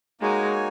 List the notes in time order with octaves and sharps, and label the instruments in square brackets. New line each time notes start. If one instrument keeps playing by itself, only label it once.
[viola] G#3 [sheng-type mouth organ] A#3 D#4 F#4 C#5 G#5